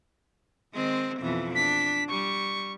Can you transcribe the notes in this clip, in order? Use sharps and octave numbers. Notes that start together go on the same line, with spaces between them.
D#3 G#3 C4
F2 B2 E3
D4 B6
G3 C#6